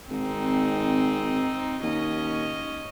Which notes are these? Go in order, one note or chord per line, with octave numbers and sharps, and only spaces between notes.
G#1 C4 D#4
D#2 C#4 D#5